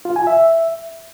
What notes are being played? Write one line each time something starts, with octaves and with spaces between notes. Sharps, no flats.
F4
G#5
E5